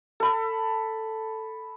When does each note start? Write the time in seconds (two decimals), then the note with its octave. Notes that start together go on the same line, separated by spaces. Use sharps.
0.20 A4 B5